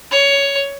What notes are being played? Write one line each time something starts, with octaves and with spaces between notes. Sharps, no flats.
C#5